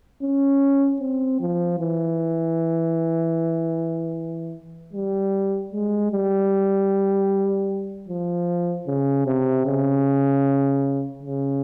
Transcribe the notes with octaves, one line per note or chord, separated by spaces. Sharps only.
C#4
C4
F3
E3
G3
G#3
G3
F3
C#3
C3
C#3
C#3